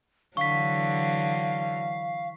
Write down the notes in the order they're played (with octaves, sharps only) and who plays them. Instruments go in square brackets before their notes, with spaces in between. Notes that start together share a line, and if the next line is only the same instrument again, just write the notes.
[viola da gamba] D3 E3 F#3 [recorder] F5 [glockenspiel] C#6 B6